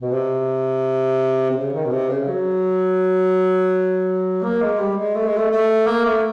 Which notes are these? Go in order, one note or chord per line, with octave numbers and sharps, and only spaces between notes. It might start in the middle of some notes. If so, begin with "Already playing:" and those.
B2
C3
C3
C#3
D#3
B2
C3
C#3
F#3
A#3
G#3
G3
G#3
A3
G#3
A3
A3
A#3
A3